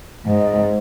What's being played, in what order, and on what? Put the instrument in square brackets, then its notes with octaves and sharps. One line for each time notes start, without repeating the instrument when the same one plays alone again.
[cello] G#2